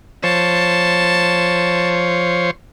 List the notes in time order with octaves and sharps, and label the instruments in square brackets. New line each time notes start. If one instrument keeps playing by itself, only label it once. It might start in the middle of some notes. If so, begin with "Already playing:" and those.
[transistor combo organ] F3 C5 C#5 [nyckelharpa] A5